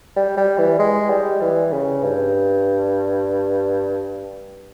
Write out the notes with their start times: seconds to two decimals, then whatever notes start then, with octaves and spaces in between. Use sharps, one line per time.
0.16 G3
0.37 G3
0.58 E3
0.79 G#3
1.10 G3
1.41 E3
1.73 C#3
2.04 G2